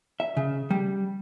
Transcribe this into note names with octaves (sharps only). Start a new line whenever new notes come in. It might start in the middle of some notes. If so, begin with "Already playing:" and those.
E5
C#3
G3